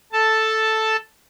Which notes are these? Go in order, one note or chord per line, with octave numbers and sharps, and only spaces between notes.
A4 A5